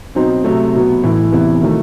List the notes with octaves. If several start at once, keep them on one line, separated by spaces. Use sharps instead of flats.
B2 F#3 C4 D#4
C3 F#3 A3
B2 F#3 B3
A2 E3 A3 E4
C3 E3 B3 E4
D#3 F#3 A3